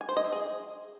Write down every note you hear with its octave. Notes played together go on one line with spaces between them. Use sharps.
G#5
C5
D#5
E5
G#4